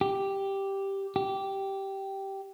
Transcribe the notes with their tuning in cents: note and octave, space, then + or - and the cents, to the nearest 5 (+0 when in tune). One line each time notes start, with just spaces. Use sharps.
G4 +0
G4 -10